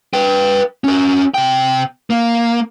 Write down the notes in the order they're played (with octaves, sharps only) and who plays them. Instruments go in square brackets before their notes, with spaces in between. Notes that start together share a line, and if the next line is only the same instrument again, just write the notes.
[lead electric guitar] B4 G5
C#4 A#4
C3 G5
A#3